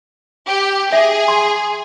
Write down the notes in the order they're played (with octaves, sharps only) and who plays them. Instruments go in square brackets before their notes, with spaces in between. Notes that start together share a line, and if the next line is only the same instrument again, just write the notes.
[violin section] G4
[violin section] G#4 [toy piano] E5
[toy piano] C6